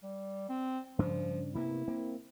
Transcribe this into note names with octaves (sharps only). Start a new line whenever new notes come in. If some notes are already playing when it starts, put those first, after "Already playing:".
G3
C4
G2 C#3 F3 D4
C3 A#3 B3 E4
A#3 C4